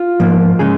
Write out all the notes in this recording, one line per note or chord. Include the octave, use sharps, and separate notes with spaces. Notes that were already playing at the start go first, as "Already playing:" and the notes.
Already playing: F4
G#2 F3 A#3
C#3 G#3 G#4